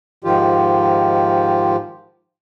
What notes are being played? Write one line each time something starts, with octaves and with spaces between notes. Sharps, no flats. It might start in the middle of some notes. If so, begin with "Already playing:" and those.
G#2 D#3 F3 F4 G4